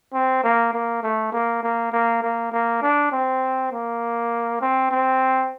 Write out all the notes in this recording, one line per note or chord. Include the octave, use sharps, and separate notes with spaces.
C4
A#3
A#3
A3
A#3
A#3
A#3
A#3
A#3
D4
C4
A#3
C4
C4